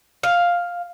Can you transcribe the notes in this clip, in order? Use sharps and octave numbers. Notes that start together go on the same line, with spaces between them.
F5